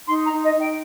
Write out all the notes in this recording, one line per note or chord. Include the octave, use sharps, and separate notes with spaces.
D#4 C6
A#5
D#4
D#5
D#4
G5